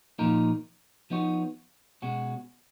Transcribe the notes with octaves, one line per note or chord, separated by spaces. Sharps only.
A#2 F3 A#3 D#4 A#4
F3 B3 D#4 F#4 C#5
B2 G#3 C#4 F#4